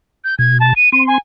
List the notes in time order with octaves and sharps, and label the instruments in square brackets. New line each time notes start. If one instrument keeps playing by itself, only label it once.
[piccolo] G6
[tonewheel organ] B2 [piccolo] G#6
[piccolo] A5
D#7
[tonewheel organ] C4 C6 [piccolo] D#7
[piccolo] G#5